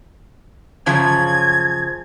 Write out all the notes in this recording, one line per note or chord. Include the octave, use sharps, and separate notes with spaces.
F#2 C#3 F3 G#6